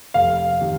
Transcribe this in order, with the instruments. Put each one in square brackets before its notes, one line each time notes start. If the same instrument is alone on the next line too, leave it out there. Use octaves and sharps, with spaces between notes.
[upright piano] F1 [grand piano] F5
[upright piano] C3 D#3